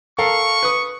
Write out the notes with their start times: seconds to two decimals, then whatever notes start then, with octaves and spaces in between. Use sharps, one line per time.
0.18 A4 A#4 F5 C#6
0.63 B4 D#6